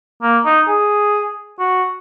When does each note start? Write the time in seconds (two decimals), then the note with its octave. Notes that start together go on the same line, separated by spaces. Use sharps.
0.22 A#3
0.45 D#4
0.67 G#4
1.59 F#4